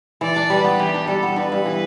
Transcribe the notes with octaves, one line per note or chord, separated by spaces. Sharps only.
E3 D5
D4
G3 B4
B3
E3 G4
D4
G3 A4
B3
G2 B4
G2
E3